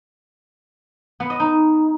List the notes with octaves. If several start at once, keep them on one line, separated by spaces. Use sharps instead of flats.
B3
D#5
D#4